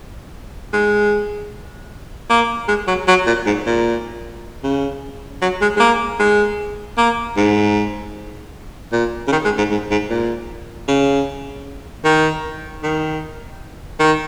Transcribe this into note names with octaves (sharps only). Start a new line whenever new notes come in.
G#3
A#3
G#3
F#3
F#3
A#2
G#2
A#2
C#3
F#3
G#3
G#3
A#3
G#3
A#3
G#2
A#2
C#3
D#3
G#3
G#2
G#2
G#2
A#2
C#3
D#3
D#3
D#3